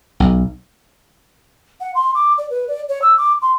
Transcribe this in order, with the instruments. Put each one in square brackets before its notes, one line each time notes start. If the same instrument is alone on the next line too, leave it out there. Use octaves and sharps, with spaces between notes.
[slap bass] B1
[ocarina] F#5
C6
D6
D5
B4
D5
C#5
E6
D6
C6